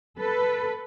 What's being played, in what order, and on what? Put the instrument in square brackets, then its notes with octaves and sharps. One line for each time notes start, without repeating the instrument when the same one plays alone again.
[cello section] A4 B4